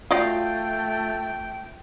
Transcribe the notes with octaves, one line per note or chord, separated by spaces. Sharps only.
A3 F4 F#4 D5 D#5 G5